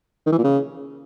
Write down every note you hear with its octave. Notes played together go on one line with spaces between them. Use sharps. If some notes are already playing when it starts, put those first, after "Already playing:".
D#3
E3
A#2
C#3